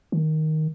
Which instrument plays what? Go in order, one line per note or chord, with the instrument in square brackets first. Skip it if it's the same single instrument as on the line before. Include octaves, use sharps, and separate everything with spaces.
[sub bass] D#3